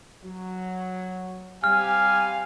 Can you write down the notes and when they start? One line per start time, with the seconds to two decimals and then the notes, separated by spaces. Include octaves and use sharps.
0.24 F#3
1.64 G3 C4 G4 F5 G#5 F6